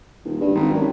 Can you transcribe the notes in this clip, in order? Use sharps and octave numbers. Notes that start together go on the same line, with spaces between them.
D#1
G2
G#1
F#2